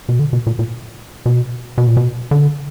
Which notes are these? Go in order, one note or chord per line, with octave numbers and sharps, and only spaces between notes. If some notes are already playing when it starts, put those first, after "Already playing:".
B2
D3
B2
A#2
A#2
B2
B2
A#2
B2
D3